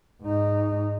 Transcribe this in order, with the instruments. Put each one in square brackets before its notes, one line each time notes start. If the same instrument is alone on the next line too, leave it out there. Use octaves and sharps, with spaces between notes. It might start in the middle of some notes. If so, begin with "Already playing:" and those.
[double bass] G#2 D#4